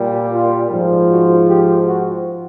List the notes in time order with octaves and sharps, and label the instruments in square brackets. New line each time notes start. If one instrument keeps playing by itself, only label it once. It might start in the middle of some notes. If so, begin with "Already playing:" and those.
Already playing: [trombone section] A#2 G3
F4
G#2 F3
F#4
G4
F#4